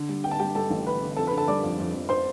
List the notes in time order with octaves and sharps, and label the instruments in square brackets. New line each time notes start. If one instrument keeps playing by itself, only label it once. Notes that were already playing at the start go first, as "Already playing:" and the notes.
Already playing: [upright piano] D3
G3
D3 G5
A5
G3 G4 G5
G3 A4 A5
A1
D3 B4 B5
D3
F2 A4 A5
B4 B5
D3
A4 A5
G3 D5 D6
F2
F2
F2
C5 C6